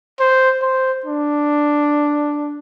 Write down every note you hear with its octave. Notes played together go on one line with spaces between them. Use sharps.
C5
C5
D4